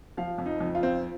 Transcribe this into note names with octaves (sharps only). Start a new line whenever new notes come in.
F3 F5
F2
D#4
F2
F4
C4